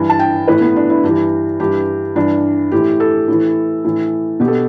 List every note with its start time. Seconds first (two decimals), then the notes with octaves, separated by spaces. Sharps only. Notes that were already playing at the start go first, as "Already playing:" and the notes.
Already playing: G2 E3
0.10 A5
0.19 G5
0.48 A2 E3 B4
0.61 B3
0.76 D4
0.90 E4
1.04 G2 E3 G4
1.60 G2 E3 G4
2.16 G2 E3 D4
2.71 A2 E3 G4
3.00 A4
3.28 A2 E3
3.85 A2 E3
4.40 B2 G4
4.48 A4